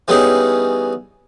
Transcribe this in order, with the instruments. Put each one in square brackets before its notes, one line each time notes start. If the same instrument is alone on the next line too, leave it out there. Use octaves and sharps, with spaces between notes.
[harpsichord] E3 G3 B3 C#4 D#4 G#4